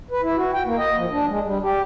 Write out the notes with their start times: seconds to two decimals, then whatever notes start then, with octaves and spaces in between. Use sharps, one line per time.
0.11 B4
0.23 E4
0.36 F#4
0.53 G5
0.65 A#3
0.78 D#5
0.96 F3
1.11 D4
1.27 G#3
1.44 G3
1.62 G4